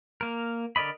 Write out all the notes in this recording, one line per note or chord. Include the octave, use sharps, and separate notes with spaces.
A#3 A#4
D3 A#4 D5 D#5 B5